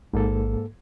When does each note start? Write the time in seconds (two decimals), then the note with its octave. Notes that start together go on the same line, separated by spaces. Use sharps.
0.14 A1 G#2 A#3 A4